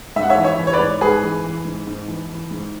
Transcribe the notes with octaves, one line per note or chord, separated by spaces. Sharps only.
G#2 E5
F#5
C#5 E5
E3
C#5 E5
E3
C#5
B4 D5
G#2
G#2 G#4 B4
E3
E3
G#2
G#2
E3
E3
G#2